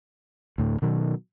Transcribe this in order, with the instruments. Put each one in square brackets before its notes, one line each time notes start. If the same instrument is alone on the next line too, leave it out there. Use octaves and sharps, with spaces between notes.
[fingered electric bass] D2 A2
B2 D#3 F#3